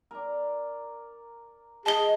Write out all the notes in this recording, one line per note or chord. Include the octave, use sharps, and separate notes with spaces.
A#4 D5
G#4 D#5 A5 G7